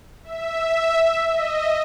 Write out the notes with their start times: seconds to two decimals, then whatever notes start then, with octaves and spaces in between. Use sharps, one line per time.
0.24 E5
1.31 D#5